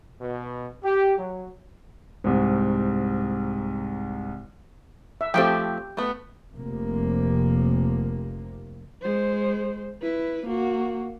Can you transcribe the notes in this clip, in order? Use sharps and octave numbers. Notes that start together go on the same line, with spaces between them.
B2
G4
F#3
C2 G#2
E5
F3 A3 C4 G4 G5
A3 B3
F1 C3 A#3
G#3 C5
E4 B4
A#3 F#4